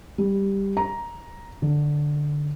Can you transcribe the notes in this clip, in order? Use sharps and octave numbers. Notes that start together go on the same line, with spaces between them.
G3
A#5
D3